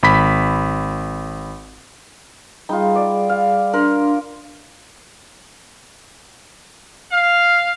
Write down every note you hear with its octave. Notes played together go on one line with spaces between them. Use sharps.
G#1 B5 B6
G3 D#4 F4 G#4 B5
D5
F5
D4 A#4 C6
F5